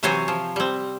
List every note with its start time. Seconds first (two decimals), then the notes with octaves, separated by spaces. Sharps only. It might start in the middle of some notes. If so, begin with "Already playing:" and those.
0.03 C3 E3 F#3 C5 C#5 G#5
0.28 F3
0.56 G3 C4